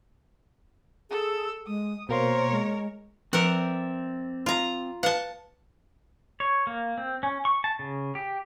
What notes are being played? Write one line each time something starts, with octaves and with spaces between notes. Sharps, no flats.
G#4 A4 E6
G#3 D#6
B2 A#3 A#4 C5 C#5 C6
G#3
F3 C4 A#4 D5 E5 F#5
F4 A#5
B4 F5 F#5 A5
C#5
A#3
C4
C#4
C#6
A5
C#3
G4